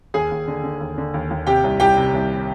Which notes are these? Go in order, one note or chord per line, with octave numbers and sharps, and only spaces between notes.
D#2 G#4 G#5
D#2
D3
D3
D#2
D3
D#2
D#2
C3 G4 G5
C2
C2 G4 G5
C3
C2